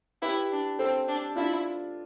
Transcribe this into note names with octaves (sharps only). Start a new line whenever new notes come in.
E4 G4 B4
D4
C4 A4 C5
D4
D4 E4 F4